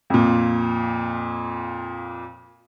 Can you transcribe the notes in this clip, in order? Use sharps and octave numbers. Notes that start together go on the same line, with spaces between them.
F2 A#2